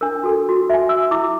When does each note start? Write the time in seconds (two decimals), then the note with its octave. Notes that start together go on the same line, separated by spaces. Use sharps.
0.01 D4 A#4
0.24 F#4 A4
0.49 F#4
0.70 E5 G#5
0.89 E6
1.11 E4 D6